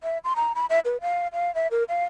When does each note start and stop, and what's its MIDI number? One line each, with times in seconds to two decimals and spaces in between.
0.03 0.18 76
0.24 0.33 84
0.36 0.53 82
0.55 0.66 83
0.70 0.80 76
0.85 0.97 71
1.01 1.28 77
1.33 1.53 77
1.55 1.67 76
1.71 1.84 70
1.89 2.04 77